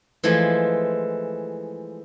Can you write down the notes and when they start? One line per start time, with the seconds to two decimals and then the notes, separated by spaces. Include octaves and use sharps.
0.24 E3 F3 G#3 A3 E4